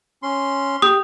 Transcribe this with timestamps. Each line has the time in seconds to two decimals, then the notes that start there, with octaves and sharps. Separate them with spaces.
0.23 C#4 C6
0.82 G4 D#6